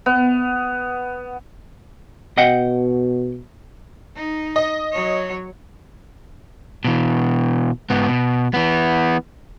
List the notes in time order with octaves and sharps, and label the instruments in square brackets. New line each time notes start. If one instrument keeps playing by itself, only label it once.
[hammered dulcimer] B3
[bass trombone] B2 [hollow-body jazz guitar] D#5 F#5 G5
[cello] D#4
[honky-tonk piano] D#5
[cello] F#3 C#5
[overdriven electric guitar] B2 E3
G#2 B3
B2
E3 B3